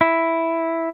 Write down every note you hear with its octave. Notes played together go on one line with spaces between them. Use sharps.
E4